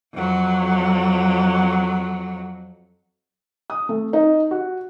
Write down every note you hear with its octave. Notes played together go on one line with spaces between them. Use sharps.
F2 F#3
D#6
A3
D#4
F#4